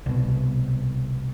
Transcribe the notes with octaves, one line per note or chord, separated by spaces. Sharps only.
C2 B2